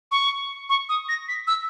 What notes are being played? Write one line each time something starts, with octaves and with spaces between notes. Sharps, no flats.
C#6
C#6
D#6
A#6
B6
E6